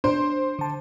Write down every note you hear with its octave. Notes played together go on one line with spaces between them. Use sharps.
D4 C5
D3 A5